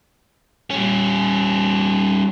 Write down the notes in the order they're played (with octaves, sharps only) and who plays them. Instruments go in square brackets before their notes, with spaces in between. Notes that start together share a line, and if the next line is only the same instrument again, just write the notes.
[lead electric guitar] G3 C#4